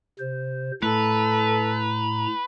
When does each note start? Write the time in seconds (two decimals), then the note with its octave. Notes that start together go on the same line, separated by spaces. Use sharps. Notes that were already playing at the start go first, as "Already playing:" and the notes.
0.19 C3 C5
0.83 A2 A3 A4 B4 A#5